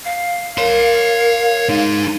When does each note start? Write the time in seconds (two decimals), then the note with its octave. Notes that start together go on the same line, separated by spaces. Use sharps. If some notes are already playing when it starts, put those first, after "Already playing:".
0.05 F5
0.58 A#4 C#5 C6
1.69 D#4 G#4